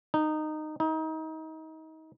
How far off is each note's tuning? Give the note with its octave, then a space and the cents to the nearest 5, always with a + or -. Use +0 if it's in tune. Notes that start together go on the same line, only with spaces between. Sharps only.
D#4 -15
D#4 +30